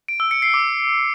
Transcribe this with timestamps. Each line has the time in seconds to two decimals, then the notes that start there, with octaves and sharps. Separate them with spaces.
0.08 D7
0.20 E6
0.31 C#7
0.42 C7
0.54 D6